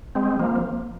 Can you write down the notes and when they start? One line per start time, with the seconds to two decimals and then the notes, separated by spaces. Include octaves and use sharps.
0.15 G#3 C4
0.39 F3 A#3